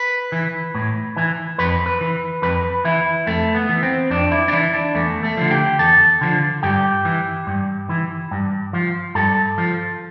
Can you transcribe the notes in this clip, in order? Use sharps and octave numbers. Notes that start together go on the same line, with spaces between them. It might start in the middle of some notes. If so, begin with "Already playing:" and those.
Already playing: B4
E3
A2
E3
F2 B4
B4
E3
F2 B4
E3 E4
F2 A3
B3
E3
C4
F2 D4
E4
D4
E3 E4
D4
E2 A3
A3
D3 F3
G4
E2 A4
D3 F3
G2 G4
E3
G2
E3
G2
F3
G2 A4
F3